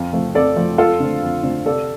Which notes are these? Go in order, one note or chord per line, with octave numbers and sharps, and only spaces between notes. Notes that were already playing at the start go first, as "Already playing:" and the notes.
Already playing: F2 F4
F3 A3 C4
F2 A4 D5
F3 A3 C4
F2 F4 A4
D3 A3 C4
F2
D3 A3 C4
C3 A4 D5